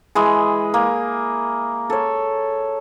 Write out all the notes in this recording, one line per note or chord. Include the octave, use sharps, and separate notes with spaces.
E3 G#3 G#4
A#3
A4 C#5